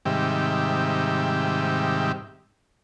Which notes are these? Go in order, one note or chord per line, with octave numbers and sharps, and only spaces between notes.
G#2 C3 D#3 G3 G4 E5